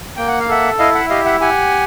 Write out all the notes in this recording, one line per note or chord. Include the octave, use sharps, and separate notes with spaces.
A#3 G5
F#5
F5
A4 E5 F#5
E4 D#5 F5
E5 F#5
G4 D#5 F5
E5 F#5
G4 F#5 G#5